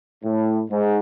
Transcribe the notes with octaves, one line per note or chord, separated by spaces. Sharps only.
A2
G#2